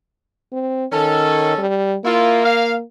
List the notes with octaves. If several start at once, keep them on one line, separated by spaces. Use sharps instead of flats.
C4
D#3 C#4 A4
G3
A#3 E4 F4
F5